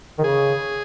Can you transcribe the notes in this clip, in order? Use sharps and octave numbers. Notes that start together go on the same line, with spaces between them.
D#3
C#3 G#4